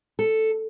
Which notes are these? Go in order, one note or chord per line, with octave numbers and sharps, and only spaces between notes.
A4